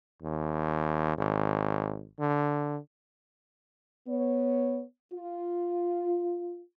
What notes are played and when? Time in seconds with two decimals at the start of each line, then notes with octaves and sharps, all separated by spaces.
0.22 D#2
1.18 G#1
2.19 D3
4.08 B3 C#5
5.13 F4